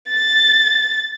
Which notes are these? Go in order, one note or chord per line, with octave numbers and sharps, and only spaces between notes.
A6